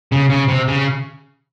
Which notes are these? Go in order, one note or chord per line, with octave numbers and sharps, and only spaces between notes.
C#3
C#3
C3
C#3